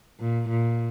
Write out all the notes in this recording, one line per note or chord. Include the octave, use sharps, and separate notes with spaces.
A#2
A#2